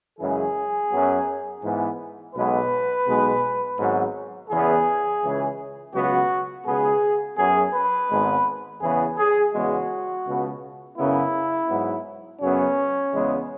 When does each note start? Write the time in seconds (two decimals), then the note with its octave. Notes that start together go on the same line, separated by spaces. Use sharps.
0.20 F#2 C#3 E3 G#3 G#4
0.91 F#2 F#3 B3
1.63 G#2 E3 B3
2.35 B1 B2 G#3 B3 B4
3.07 B1 B2 G#3 B3
3.79 G#1 G#2 F#3 B3
4.51 E2 C#3 E3 B3 G#4
5.22 C#2 C#3 E3
5.94 C#2 B2 F#3 B3 F#4
6.66 C#2 B2 B3 G#4
7.38 F#2 F#3 B3 G#4
7.74 B4
8.10 G#1 G#2 G#3 B3
8.81 E2 C#3 E3 B3 G#4
9.18 G#4
9.53 E2 C#3 G#3 B3 F#4
10.25 C#2 B2 B3
10.97 F#2 C#3 F#3 B3 E4
11.69 G#2 F#3 B3
12.41 F#2 C#3 F#3 B3 C#4
13.13 E2 C#3 G#3 B3